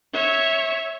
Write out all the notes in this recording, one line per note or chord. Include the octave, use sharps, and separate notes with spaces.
C#5 E5